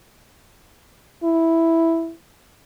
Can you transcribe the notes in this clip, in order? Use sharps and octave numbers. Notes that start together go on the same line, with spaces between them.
E4